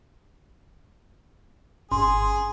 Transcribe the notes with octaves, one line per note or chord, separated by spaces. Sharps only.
G1 G#4 C6